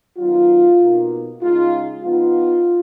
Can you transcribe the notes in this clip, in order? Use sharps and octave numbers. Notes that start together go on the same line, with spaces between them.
D#3 F#3 B3 D#4 F4
B2 A#3 D#4
C#3 G#3 D#4 F4
F3 B3 D#4 F4